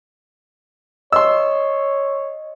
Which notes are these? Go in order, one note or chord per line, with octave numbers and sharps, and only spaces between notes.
C#5 D#5 C6 E6